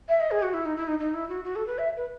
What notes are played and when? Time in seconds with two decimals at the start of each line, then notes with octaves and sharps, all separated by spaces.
0.09 E5
0.20 D#5
0.31 G#4
0.43 F#4
0.54 E4
0.66 D#4
0.77 E4
0.88 D#4
0.99 D#4
1.14 E4
1.29 F#4
1.44 F#4
1.56 A4
1.67 B4
1.78 E5
1.97 B4